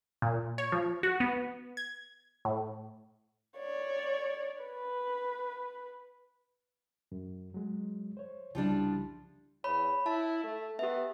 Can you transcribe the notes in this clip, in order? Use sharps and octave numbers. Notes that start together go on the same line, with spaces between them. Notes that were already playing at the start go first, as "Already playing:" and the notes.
A#2
C#5
F3
F#4
B3
G#6
A2
C#5 D5
B4
F#2
F#3 G#3
C5 C#5
C2 C#3 F3 G3 D4 E4
E2 C#5 B5
E4 A5
A3
B3 G4 E5